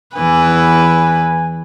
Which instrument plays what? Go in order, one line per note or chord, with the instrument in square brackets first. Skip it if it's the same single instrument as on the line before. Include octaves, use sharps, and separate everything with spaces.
[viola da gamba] E2 E3 B4 [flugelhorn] G#5